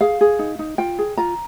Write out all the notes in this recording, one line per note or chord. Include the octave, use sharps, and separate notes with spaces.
G#4 F5
G#4
D#4
D#4
F4 G5
G#4
F4 A#5